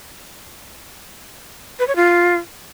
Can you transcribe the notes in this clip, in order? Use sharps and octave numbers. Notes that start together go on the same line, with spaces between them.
B4
C#5
F4